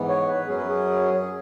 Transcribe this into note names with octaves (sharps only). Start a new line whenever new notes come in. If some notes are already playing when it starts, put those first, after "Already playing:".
Already playing: G#2 E3 B3
C#5
B4
F#2 F#3 C#4 G#4
B4
G#4